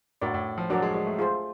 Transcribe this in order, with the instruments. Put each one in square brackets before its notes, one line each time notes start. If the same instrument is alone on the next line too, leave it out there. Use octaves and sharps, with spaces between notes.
[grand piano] A2 [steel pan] D4 F#4 A#4 D5
[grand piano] A2
F3
[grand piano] F#3 [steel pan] D4 F#4 A#4 D5
[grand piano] G#3
G#3
A3
[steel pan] F4 G#4 C5